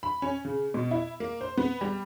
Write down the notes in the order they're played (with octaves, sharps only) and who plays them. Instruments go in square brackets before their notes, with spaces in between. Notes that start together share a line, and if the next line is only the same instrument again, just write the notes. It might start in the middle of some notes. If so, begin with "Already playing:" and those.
[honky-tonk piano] B5
C#4
C#3
B2
E4
A#3
C5
B3
G3